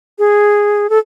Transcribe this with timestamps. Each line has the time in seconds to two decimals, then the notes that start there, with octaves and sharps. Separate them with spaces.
0.19 G#4
0.90 A4